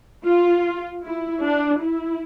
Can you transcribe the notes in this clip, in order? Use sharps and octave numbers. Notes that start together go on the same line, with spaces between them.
F4
E4
D4
E4